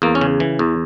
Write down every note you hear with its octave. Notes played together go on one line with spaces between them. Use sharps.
E2 A#3
C#4
C#3
E3
E2